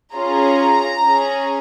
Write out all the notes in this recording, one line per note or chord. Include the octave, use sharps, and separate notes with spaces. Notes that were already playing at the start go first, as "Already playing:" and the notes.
C#4 F4 G#4 A#5
C#4 G#4